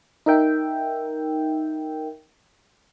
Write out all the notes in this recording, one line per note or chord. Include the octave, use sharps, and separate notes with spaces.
D#4 A#4 E5 G5